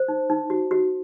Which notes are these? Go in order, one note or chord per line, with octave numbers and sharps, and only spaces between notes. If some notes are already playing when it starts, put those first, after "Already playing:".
Already playing: C5
D#4
D#4
F#4
F#4